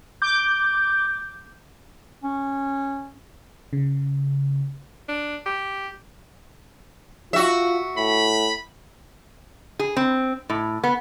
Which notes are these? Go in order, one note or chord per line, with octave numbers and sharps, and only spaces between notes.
D6 G6
C#4
C#3
D4
G4
F4 F#4 E5
A2 B5
G#4
C4
A2
B3